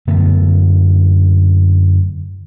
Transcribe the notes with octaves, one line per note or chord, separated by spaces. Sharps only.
F#2 D3 A3 B3